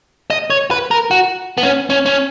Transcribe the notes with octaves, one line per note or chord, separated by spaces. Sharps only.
D#5
C#5
B4
A#4
F#4
B3
C#4
C#4
C#4